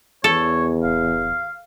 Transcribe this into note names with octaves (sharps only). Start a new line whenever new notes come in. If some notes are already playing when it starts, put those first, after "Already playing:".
E2 E3 A4 C#5
D1 F5